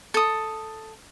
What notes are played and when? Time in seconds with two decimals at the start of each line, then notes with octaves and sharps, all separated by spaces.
0.14 A4 D#6